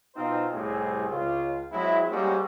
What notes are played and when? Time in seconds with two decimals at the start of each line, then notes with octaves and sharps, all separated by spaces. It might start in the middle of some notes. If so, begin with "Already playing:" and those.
0.15 B2 C4 D#4 F4 C5
0.53 C2 A2 G3 C4 G#4
1.09 C#2 F4
1.72 F#3 G#3 C4 E4
2.10 G3 G#3 A#3 C4 C#4 F#4